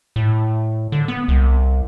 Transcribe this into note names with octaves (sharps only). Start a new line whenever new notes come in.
A2
D3
B3
C2